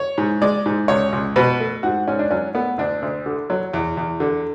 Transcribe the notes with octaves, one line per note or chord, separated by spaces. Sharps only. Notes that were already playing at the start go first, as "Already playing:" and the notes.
Already playing: C#5
G#2
G#3 D5
G#2
C#2 C#5
C#2
B2 B4
A3
G#2 F#4
G#2 C#4
D4
F#3 C#4
A3 B3
D2 D4
D2
D3
F#3
E2
E2
D3